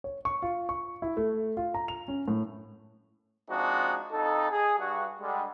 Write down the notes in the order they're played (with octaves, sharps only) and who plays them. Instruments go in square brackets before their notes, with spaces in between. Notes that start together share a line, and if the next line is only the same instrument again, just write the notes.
[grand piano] C#5
C#6
F4
C#6
E4
A3
F4
A#5
F7
C#4
A2
[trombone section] F3 G#3 C4 D4 D#4 F#4
F2 D#4 A4
G#4
G2 F#4
D3 G3 G#3